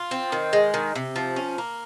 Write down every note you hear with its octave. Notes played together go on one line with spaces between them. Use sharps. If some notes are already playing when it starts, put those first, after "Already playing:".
Already playing: F4
C4
D#3
G#3
D#3
C3
F3
C#4
A#3